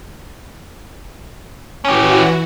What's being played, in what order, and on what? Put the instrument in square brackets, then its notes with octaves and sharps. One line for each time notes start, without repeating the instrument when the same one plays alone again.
[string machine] E3 F#4 [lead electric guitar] C#4 G4